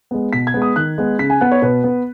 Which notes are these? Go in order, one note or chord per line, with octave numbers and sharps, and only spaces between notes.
G#3 B3
B2 B6
G#6
G#3 B3
D#6
D#3 F#6
G#3 B3
C#3 B6
G#5
B3 F#5
C#5
B2 B4
B3